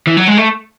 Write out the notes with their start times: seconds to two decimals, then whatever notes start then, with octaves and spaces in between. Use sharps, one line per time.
0.07 E3
0.17 F#3
0.28 G#3
0.37 A3